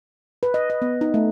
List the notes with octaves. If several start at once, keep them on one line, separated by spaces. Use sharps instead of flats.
B4
D#5
D#5
B3
D#4
A3